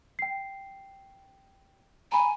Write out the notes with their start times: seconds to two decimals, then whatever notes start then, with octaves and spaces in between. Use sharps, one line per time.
0.19 G5 C7
2.12 G#5 A#5 B5